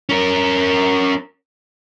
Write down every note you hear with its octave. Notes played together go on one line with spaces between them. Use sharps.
C#4 A#4